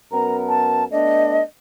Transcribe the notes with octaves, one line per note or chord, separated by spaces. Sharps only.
F#2 B3 A#4 A#5
A5
A3 B3 D4 D#5